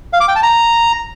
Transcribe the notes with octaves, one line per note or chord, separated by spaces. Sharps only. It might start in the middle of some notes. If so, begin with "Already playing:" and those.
F5
D6
G5
A5
A#5